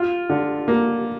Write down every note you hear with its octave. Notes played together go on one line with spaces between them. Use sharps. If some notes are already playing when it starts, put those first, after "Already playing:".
Already playing: F4
D3
A#3